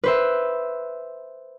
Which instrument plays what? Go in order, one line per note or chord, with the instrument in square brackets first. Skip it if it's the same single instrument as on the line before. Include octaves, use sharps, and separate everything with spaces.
[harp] B4 C5 E5